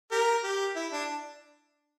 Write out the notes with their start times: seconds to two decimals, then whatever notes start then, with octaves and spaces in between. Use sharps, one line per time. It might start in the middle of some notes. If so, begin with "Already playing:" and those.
0.12 G4 A#4
0.43 G4
0.76 E4
0.93 D4